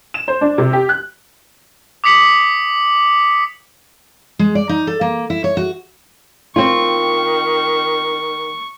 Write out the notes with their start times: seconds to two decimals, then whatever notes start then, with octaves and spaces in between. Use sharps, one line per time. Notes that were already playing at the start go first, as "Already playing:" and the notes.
0.14 E7
0.28 C5
0.41 D4
0.58 C3
0.73 G4
0.89 F#6
2.04 D6 D#6 B6 C#7 F#7
4.39 G#3
4.55 D5
4.69 D#4
4.87 A4
5.01 A#3
5.30 E4
5.44 C#5
5.57 F#4
6.56 D#3 C4 F4 C#6